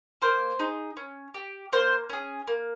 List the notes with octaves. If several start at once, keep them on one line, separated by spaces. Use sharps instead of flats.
A#3 C5
D#4 G#4
C#4
G4
A#3 C5
C#4 G#4
A#3